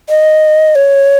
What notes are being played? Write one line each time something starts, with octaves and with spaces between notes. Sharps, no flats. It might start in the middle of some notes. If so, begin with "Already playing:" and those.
D#5
C#5